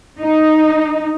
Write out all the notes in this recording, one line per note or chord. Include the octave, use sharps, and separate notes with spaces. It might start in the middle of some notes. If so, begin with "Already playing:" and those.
D#4